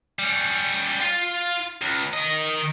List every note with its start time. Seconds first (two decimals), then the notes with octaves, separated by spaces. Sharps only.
0.19 G3 C#4
1.01 F4
1.81 C#2
2.13 D#3 D#5